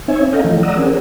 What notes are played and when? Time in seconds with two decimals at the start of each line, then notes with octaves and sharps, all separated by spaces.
0.08 C4 D#4 C#5 E5 G#5
0.33 C#4 A4 D#5 F5 G5 A#5
0.45 E3 F3 A3
0.63 D5 F#5 A#5 D#6 E6
0.75 C4 C#4 G#4 A#4